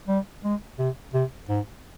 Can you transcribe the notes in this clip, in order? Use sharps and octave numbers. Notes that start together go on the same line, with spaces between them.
G3
G#3
C3
C3
G#2